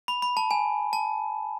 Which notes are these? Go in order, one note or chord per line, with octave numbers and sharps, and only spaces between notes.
B5
B5
A5
G#5
A5